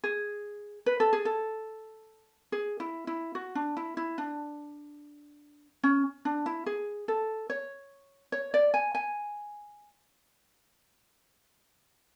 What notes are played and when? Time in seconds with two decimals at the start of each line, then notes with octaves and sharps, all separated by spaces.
0.04 G#4
0.86 B4
1.00 A4
1.13 G#4
1.25 A4
2.52 G#4
2.80 E4
3.07 E4
3.35 F#4
3.55 D4
3.77 E4
3.97 E4
4.18 D4
5.83 C#4
6.25 D4
6.46 E4
6.66 G#4
7.08 A4
7.50 C#5
8.32 C#5
8.54 D5
8.74 G#5
8.95 G#5